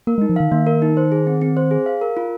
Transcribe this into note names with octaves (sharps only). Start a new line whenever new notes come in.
A#3 A#4
G#3
D#4
F3
D#3 F5
D#3 A#3
A#4
D#4
C5
G#4
C4
C4
C5
G#4
F5
A#4
F4